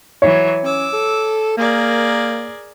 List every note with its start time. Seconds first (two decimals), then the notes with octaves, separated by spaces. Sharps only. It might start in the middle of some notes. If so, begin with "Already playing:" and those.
0.22 E3 F#3 C#5
0.63 C#4 D6 E6
0.93 A4
1.58 A#3 G#4 A#4 D5